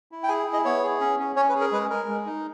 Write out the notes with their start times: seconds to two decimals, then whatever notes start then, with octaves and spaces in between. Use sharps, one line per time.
0.12 E4
0.23 G5
0.28 G#4 G#5
0.47 E4
0.53 D#5
0.65 B3 C#5
0.83 G#4
1.01 C#4
1.19 C#4
1.36 C#4 C#5
1.49 B4
1.55 G#4
1.61 A#4
1.72 G#3 B4
1.90 G#3 A#4
2.08 G#3
2.26 D#4